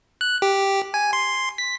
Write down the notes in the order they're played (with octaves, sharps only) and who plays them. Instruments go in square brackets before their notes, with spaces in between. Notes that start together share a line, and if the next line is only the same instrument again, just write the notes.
[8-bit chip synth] F#6
G4
G#5
C6
B6